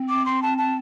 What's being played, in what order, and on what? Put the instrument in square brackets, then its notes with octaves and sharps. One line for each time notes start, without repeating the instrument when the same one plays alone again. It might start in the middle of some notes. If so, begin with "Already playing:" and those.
Already playing: [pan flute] C4
[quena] D6
C6
A5
A5